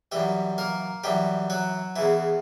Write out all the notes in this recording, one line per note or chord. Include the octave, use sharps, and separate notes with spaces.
F#2 E3 G3 G4
A#3 A#4
F#2 E3 G3 G4
F#3 F#4
E2 C#3 E3 E4